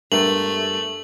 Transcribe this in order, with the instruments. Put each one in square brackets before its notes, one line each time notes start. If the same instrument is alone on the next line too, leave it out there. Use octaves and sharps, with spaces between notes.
[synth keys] G2 [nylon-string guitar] G#3 B3 A#4 [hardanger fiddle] A3 [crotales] F#7